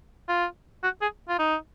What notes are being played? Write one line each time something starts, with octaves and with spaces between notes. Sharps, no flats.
F4
F#4
G#4
F4
D#4